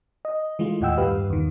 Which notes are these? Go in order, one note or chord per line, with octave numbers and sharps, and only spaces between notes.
D#5
E3 G#3 A3 F4
D#2 A2 D#5 F#5 G5 E6
G2 G3 G4 B4 F5
E2 D#3